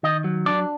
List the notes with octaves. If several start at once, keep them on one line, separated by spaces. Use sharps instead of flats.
D#3 D#5
F#3
D4 D5